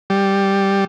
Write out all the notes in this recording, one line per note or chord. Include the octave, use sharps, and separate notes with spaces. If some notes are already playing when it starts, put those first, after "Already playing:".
G3